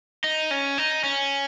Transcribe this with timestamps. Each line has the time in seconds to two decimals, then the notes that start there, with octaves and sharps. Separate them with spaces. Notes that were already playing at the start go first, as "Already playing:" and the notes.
0.24 D#4
0.51 C#4
0.78 D#4
1.04 C#4